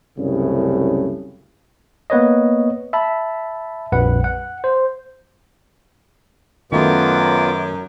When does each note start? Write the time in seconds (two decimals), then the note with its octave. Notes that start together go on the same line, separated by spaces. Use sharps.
0.19 C2 F#2 A2 C#3
2.10 A#3 B3 B4 C#5 D#5
2.93 E5 A5 B5
3.92 A#1 F2 G3 B4 F#5
4.24 F#5
4.64 C5
6.72 F#2 D#3 A3 B3 F4 D6